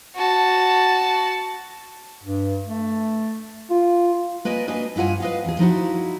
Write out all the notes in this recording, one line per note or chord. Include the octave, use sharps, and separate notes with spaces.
F#4 A5
G2
A3
F4
A#3 B4 D5 D#5 G#5
A#3 D4 F#4 B4 D#5 G#5
G2 E4 F4 F#5 G#5
B4 D#5 F5
E2 G#4
F3 D#4 E4 F#4